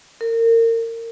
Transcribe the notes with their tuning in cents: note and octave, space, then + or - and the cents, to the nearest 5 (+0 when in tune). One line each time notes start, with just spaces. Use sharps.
A#4 -30